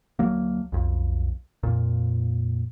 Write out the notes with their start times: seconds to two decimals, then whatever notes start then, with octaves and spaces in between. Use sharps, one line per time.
0.19 D2 F#3 A#3
0.72 B1 F2
1.63 F2 A#2